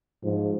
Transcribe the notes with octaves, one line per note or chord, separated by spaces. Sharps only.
G#2 F3